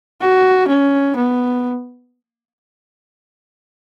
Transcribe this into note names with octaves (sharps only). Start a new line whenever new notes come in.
F#4
C#4
B3